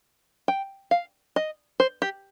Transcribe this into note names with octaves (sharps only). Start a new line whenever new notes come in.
G5
F5
D#5
C5
G4